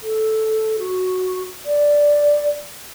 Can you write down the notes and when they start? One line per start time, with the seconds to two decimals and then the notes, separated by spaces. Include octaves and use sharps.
0.02 A4
0.79 F#4
1.65 D5